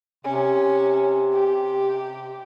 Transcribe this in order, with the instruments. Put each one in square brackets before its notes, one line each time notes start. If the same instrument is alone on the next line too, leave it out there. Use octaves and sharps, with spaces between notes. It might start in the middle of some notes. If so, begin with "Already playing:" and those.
[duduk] C3 [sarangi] C#4
[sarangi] G4